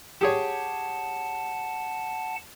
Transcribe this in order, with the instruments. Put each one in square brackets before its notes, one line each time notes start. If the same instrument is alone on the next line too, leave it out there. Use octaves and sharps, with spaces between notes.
[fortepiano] G4 G#4 C#5 [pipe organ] F#5 A5